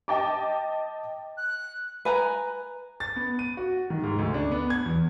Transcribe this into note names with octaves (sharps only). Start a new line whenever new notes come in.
D#5 G5 A5 D6
F#6
B4 G#5 A#5
A6
B3
D#7
F#4
D#3
G#2
D2
D4
B3
G#6
E2